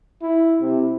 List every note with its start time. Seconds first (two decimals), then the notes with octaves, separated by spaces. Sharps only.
0.23 E4
0.62 C3